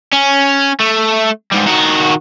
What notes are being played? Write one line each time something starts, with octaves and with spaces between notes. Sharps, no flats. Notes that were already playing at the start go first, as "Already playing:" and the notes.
C#4
A3
G#2 G3
D#3 F#4